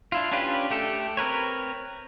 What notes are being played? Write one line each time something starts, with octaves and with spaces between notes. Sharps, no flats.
D4 E4 F4
C#4 D4 F4 G4 B4
A3 G4 A4
C4 A#4 B4 C#5